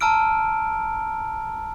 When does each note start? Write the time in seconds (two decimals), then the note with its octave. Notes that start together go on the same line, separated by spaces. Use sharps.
0.01 A5 A#5 E6 F6 D7